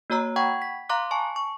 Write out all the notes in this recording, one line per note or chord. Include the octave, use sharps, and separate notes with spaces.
A#3 F#4 C#5 A#5 E6
F#5 G5 B5 C#6 G#6
B6
F5 A#5 C6 D6 F#6
G#5 A5 C#6
C#6